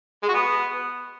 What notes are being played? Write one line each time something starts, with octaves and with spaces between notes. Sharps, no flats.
G#3
F#4
B3